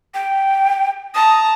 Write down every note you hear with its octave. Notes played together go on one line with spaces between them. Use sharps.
G5
A5 A#5 D#6